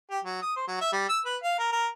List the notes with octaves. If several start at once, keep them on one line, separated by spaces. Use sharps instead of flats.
G4
F#3
D#6
C5
F#3
E5
G3
E6
B4
F5
A#4
A#4